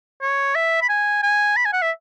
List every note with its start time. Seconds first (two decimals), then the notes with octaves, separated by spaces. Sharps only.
0.21 C#5
0.55 E5
0.81 B5
0.89 G#5
1.23 G#5
1.56 B5
1.65 G#5
1.73 F#5
1.82 E5